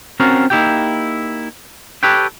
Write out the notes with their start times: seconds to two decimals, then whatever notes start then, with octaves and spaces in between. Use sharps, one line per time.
0.20 C4 C#4 F4 F#4 A#4
0.50 A#3 D#4 E4 F#4 G4 G5
2.03 G4 A4 B4 C#5 G5